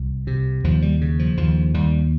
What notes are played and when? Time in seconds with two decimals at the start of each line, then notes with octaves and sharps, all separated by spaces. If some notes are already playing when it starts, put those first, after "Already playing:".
Already playing: C2
0.27 C3
0.64 D#2 F3
0.82 G3
1.01 C#3
1.19 F3
1.37 D#2 F3
1.74 D#2 G3